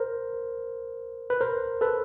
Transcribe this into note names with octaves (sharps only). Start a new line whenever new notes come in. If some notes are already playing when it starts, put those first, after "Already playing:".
Already playing: A#4 C5
B4
A#4 C5
A4 B4